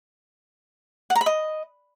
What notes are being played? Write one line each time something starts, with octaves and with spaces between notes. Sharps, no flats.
F#5
A#5
B5
D#5